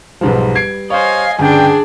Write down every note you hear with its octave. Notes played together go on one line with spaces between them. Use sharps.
B1 G#2 F3 G3 B4
G#6 C7 D7
C5 C#5 D#5 F5 G#5
G1 C#3 D4 G#4 D5 G5 G#5